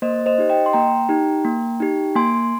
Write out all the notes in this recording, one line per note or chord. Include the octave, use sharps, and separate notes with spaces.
A#3 C5 D#5
C5 D#5
D#4 G4
D#5 G5
C6
A#3 G5 A#5
D#4 G4
A#3
D#4 G4
A#3 G#5 C6